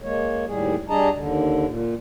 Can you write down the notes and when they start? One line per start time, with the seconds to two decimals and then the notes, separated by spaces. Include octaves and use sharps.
0.02 G#3 A#3 C#5
0.47 D#2 A2 G3 G#4
0.89 G3 D4 G#4 D#5 A5 A#5
1.16 D#2 D3
1.67 A#2